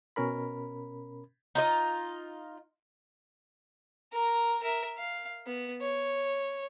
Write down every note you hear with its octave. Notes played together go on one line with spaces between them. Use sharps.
B2 C#4 A#4 B5
D#4 F4 D#5
A#4 A#5
A#4 E5
F5
B3
C#5